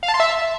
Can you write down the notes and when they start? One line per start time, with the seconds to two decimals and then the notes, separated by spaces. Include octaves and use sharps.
0.03 F5
0.08 A5
0.14 C6
0.20 E5